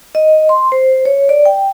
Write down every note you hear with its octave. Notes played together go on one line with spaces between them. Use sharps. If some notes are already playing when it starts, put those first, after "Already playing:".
D#5
C6
C5
C#5
D5
G5